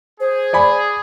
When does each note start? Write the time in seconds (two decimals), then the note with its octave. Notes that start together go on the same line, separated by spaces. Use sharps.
0.20 G#4 C5
0.53 D5 G#5 B5